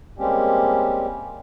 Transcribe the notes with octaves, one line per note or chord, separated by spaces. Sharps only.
G3 G#3 A#3 C4 C#4 G4